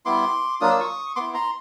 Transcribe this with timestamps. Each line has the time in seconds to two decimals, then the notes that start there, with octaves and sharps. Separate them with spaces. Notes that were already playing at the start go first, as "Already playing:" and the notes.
0.05 G3 B3 E4 C6 D6
0.61 F#3 A#3 D4 F4 D#6
0.70 E6
0.80 C#6 D#6
1.16 B3 E4 C6 D6
1.34 A#5 C6